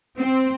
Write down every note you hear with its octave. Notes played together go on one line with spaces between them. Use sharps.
C4